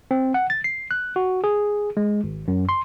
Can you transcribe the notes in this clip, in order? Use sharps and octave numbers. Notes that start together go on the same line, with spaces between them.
C4
F#5
A6
C7
F#6
F#4
G#4
G#3
G#1
F#2
C6